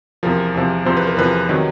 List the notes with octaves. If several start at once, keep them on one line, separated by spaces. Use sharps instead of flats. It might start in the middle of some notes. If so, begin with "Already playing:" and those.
E2 C3 F3 A#4
E2 C3 F3
E2 C3 F3 C5
B4
A#4
E2 C3 F3 B4
C3 D#3 F#3 B4